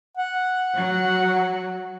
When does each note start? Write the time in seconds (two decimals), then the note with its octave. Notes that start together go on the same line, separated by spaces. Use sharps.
0.17 F#5
0.75 F#3